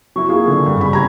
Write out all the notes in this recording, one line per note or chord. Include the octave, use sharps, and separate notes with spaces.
F#3 E4 C#6
A#3 F4 G#4
D3 E3
G2
G1 C#3 B5
G4 A#5 G#6